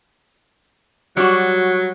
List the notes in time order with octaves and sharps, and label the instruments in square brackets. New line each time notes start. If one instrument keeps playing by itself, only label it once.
[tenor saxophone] F#3 [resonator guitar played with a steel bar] G3 F#4